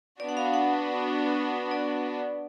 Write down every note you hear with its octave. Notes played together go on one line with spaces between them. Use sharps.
B3 D4 F#4 D5
F#5
F5
F#5
D5